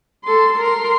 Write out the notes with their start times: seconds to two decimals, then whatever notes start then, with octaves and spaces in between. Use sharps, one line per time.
0.24 A4 C6
0.58 A#4 C6